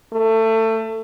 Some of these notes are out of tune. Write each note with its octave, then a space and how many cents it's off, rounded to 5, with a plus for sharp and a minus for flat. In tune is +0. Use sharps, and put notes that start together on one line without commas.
A3 +25